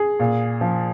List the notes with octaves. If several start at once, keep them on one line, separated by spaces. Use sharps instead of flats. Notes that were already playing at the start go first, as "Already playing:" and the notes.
Already playing: G#4
A#2
F3